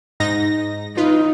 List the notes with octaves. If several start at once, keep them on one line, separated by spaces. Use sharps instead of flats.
G#2 D#4 A#6
D#4 F4 B4